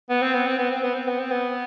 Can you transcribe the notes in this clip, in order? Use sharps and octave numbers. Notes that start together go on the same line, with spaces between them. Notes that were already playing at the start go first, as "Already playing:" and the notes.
B3
C4
B3
C4
B3
C4
B3
C4
B3
C4
B3